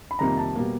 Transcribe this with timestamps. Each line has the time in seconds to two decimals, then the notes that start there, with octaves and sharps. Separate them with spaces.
0.11 B5
0.19 F2 C3 D#3 G3 A#3 A#5
0.37 A5
0.55 B2 G3 A#3